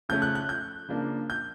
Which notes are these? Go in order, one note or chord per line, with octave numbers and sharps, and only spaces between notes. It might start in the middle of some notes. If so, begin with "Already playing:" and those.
C#3 F3 A3 C#4 G6
F#6
F#6
G6
C#3 F3 A#3 D4
G6